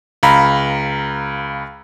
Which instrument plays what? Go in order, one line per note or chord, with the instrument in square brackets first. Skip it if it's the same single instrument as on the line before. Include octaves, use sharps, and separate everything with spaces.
[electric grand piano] C#2 F5 A#5 B5